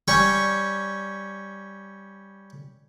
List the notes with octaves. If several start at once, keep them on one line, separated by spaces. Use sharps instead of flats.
G3 C#4 C#6